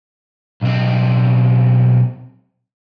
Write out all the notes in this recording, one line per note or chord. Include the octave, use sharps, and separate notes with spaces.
B1 C4